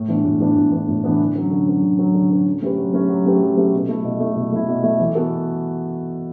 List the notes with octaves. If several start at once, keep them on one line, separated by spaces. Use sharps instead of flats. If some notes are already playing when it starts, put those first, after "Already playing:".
Already playing: A2
E3 B3 D4
A2
E3 B3 D4
A2
E3 B3 D4
A2
E3 B3 D4
D3
F#3 C#4
D3
F#3 C#4
D3
F#3 C#4
D3
F#3 C#4
F#3
A3 C#4 G4 B4
F#3
A3 C#4 G4 B4
F#3
A3 C#4 G4 B4
F#3
A3 C#4 G4 B4
B2
A3 E4
B2
A3 E4
B2
A3 E4
B2
A3 E4
E3
B3 F#4 A4